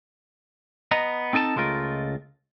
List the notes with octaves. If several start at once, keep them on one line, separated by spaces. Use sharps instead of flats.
B3 D#5 A#5
C4 D#4 A4 G#5 A5
C#2 G#3 A3 F4 A#4